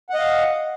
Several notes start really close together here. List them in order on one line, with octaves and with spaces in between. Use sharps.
F#5 D#5 F5